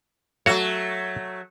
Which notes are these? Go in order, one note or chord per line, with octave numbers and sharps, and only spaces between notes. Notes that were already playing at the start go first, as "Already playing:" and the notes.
F#3 A3 F#4 C#5